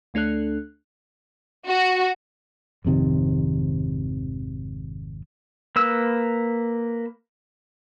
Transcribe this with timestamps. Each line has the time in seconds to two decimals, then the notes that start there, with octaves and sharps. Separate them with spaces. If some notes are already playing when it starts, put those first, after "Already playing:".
0.14 D2 A3 D4 A4 F#6
1.67 F#4
2.85 G#1 F2 C3 D#3
5.76 A#3 B4 E6